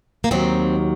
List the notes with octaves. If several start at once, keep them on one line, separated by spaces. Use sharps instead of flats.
A#3
D#2 D#3 F#3 C4